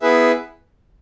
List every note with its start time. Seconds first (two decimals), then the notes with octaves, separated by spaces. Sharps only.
0.02 B3 E4 G#4 B4 E5